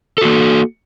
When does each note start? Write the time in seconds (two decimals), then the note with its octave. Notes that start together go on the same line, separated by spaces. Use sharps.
0.18 A4
0.22 F#4
0.25 A#3